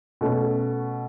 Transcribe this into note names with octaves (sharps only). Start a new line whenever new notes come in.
B2 A3 C#4